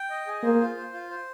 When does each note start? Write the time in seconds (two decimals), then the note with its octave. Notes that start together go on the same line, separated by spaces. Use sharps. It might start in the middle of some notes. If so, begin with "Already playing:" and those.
Already playing: G5
0.10 D#5
0.27 G#4
0.43 A#3 C5
0.60 F4
0.77 C5
0.93 F4
1.10 C5